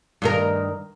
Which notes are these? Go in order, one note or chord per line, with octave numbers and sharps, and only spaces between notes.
G2 D#3 A#4